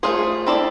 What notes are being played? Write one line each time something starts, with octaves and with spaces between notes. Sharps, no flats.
A3 D4 F4 G#4 C5
C4 E4 A4 D5